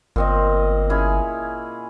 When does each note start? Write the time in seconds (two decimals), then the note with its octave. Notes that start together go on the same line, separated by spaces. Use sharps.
0.16 G1 A#2 C4 D#5
0.90 C#4 E4 G#4